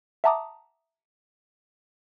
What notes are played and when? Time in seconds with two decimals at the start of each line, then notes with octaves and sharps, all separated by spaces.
0.24 E5 F#5 A5 A#5 D6 D#6